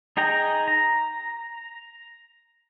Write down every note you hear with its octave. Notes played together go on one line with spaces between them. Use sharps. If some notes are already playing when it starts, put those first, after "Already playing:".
D#4 G#4 G5 A#5
A#5